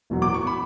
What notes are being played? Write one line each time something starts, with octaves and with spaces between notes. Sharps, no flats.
E1 E2 B2 F#3
D6
C#6
B5